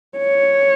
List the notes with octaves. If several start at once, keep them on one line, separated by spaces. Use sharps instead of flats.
C#5